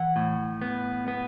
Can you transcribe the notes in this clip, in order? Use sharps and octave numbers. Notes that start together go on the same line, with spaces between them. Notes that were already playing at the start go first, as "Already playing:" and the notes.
Already playing: E3 F#5
A2
B3
B3